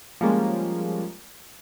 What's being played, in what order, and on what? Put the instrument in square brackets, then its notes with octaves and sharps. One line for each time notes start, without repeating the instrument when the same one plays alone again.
[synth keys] F3 G3 G#3 A#3 C#4